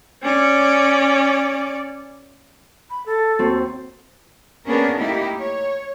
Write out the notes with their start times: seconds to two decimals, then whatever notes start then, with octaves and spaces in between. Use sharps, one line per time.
0.23 C#4 D5
2.90 B5
3.06 A4
3.39 D#2 C4 F#4
4.67 A#3 B3 C#4 D4 G#4 A#4
4.97 A3 A#3 D#4 E4 G4
5.40 C#5